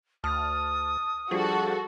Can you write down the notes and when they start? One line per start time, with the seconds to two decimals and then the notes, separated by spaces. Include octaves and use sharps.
0.24 D2 A5 D#6 F6
1.31 F3 G3 D4 F#4 G#4 A4